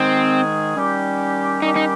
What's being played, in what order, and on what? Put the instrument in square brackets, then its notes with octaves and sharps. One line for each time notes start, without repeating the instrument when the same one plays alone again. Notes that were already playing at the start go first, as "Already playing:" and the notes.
Already playing: [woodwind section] G#2 D#3 G#3 D#4 G#4 [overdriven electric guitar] C4
[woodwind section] D#3 G3 C#4 G4
[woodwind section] D#3 G3 C#4 G4 [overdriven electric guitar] D#4
[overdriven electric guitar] D#4